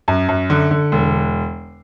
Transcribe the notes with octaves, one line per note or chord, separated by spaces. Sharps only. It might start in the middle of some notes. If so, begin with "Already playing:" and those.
F#2
F#2
D3
D3
E1